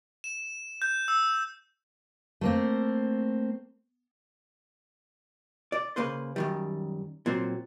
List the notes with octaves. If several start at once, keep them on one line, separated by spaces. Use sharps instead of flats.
E7
G6
E6
A3 A#3 C4
D5
C#3 A#3 B4 C5
F#2 D#3 G3
A#2 F#3 C4